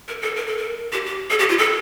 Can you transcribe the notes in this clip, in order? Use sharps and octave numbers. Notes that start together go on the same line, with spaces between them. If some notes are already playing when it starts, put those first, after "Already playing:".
A#4
A4
A#4
A4
A#4
G4
G4
A4
G4
F4
A4